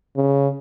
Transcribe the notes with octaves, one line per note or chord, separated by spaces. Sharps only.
C#3